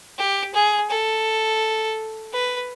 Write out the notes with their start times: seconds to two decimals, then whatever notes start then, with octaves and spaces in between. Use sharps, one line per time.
0.18 G4
0.54 G#4
0.90 A4
2.32 B4